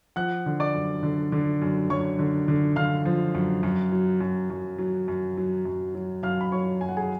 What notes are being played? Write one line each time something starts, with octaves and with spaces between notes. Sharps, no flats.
F3 F#5 F#6
D3
D5 D6
F#2
D3
D3
F#2
F#2 C#5 C#6
D3
D3
D3 F5 F6
F3
F#2
F#2
F#3
F#2
F#2
F#3
F#2
F#3
F#2
F#3
F#2 F5 F6
B5
F#3 C#5 C#6
F#2 G#5
F#5
G#4 G#5